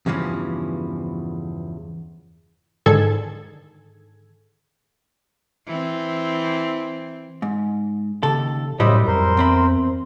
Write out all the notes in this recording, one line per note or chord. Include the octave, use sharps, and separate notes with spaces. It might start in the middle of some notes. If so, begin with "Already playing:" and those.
E2 G2 C#3 E3 F3
G#2 D3 D#3 G#4 A4 G#6
E3 C4
G#2
D#2 C#3 A4
F#2 A2 F#3 G3 E4 C5 D#5
F2 A#4 C5 C6
E2 C4 B5